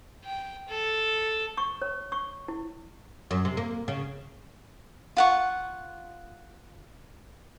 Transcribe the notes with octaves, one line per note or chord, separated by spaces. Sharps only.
G5
A4
C#6
C#5
C#6
E4
F#2
C3
A#3
C#3
F4 F#5 C#6